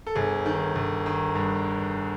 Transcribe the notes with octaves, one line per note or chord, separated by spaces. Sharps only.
A4
G1 G#4
D#3
G1
D#3
G2